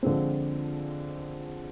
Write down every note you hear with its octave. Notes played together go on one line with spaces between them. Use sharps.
D3 F3 G#3 C4